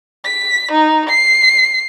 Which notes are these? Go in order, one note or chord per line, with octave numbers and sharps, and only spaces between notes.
B6
D#4
C7